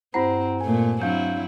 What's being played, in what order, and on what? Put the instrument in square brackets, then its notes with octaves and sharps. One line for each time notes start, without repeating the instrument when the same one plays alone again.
[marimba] G2 C5 [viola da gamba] C4 [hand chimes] E4 F#5 A#5
[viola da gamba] A#2 A3 [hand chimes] G#5
[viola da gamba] F#3 C4 E4 [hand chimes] D4 F5 G6